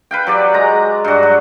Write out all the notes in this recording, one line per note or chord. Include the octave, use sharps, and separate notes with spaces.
B4 F5 G5
F#3 G4 D5
G#3 A#5
G2 F#4
F#3